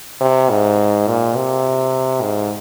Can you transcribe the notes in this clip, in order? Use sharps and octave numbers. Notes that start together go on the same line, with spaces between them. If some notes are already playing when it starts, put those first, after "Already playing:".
C3
G#2
A#2
C3
G#2